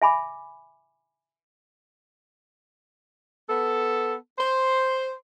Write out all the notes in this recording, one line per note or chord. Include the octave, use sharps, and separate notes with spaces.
E5 G#5 B5 D6
B3 A4
C5